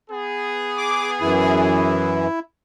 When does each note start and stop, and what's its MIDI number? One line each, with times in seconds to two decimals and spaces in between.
0.11 2.09 59
0.11 2.09 68
0.78 1.11 86
1.21 2.27 42
1.21 2.27 52
1.21 2.40 64